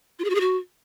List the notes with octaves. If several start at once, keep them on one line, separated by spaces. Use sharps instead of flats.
F4
G#4
F#4
G#4
F#4